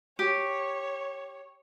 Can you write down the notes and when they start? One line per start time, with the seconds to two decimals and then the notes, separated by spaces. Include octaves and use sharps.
0.19 G4 C#5